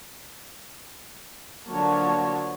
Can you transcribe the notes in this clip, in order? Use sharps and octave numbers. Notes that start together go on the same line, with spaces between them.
D3 F3 F#3 A#3 C#5 A5